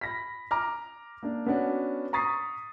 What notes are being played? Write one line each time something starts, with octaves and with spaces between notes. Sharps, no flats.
B5 A#6 B6
A#5 D6 F6
A#3 D4
B3 C#4 D4 F#4
A#5 C#6 D#6 A6 B6 C7